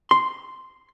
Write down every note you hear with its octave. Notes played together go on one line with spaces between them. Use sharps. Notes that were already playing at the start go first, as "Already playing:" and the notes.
C6